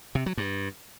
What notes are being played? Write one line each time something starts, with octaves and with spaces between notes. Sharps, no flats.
C3
F#3
G2